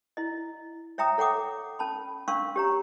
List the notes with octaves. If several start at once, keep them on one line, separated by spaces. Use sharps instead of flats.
E4 D#5
C#5 E5 G5 A#5 D#6
A4 C#5 F#5 G5 D6 D#6
C#4 A5 B5
C#4 D4 F5 C6 C#6 E6
G4 C#5 A#5